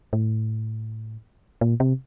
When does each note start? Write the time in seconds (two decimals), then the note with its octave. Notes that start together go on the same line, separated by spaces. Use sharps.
0.13 A2
1.61 A#2
1.80 C3